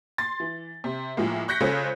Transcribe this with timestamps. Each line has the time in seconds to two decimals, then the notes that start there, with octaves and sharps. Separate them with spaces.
0.18 C6 A6
0.40 E3
0.84 C3
1.17 A2 F3 G#3 A#3
1.48 C#6 F#6 G6 A#6 B6 C#7
1.60 C#3 G#3 F4 A4 C5 C#5